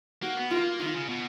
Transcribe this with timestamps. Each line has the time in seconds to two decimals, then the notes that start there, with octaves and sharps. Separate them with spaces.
0.22 A#3 F#4
0.37 B3
0.51 A#3 F4
0.79 D#3 F4
0.94 C#3
1.09 B2